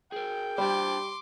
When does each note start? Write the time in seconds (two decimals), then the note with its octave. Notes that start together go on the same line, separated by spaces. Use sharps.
0.12 G#4 A#4 G5
0.58 G3 D4 C5 C6 D6